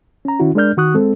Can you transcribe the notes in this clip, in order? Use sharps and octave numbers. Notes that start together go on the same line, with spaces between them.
C#4 A#5
D#3 C#4 E4 F#4
G#3 D4 A#4 D5 F6 G6
D#3 F#4 C#6 D#6 F#6
G#3 C4 A4